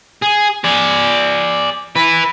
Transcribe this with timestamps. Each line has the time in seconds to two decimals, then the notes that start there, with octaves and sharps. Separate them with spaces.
0.22 G#4
0.64 G#4 D5
1.96 E4 B4